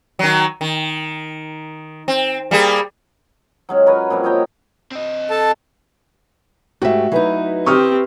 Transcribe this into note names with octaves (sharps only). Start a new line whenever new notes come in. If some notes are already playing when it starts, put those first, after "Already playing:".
D#3 F#3
D#3
C4
G3 A#3 G#4
F#3 G#3 C#4
A#4 B4 C#5 G#5
A#2 F3 G3 C4
C#5 D#5 G5 A#5
C4 D#5
A4 A5
G#2 A3 F#4 G4 E5
F#3 D#4 E4 B4 A#5
C4 G4 E5 C#6 D#6 F6